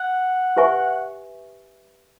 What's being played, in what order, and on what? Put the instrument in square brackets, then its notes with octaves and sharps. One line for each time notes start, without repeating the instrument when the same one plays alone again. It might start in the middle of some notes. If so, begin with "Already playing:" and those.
Already playing: [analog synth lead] F#5
[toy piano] G4 B4 E5 G#5 C#6